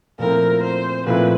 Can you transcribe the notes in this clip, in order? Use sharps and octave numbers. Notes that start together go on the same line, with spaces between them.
A#2 F3 A3 C4 E4 A#4
C5
A#2 F3 A3 C4 E4 B4